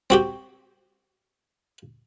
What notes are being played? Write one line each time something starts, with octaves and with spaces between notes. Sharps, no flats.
C4 F#4 G4